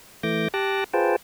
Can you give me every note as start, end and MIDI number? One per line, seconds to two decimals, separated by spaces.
0.23 0.48 52
0.23 0.48 57
0.23 0.48 86
0.23 0.48 91
0.23 0.48 94
0.54 0.84 67
0.54 0.84 81
0.54 0.84 86
0.54 0.84 90
0.54 0.84 94
0.93 1.16 65
0.93 1.16 68
0.93 1.16 71
0.93 1.16 72
0.93 1.16 79
0.93 1.16 81